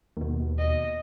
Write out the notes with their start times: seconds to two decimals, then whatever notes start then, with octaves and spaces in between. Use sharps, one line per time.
0.17 D#2 B2
0.59 D#5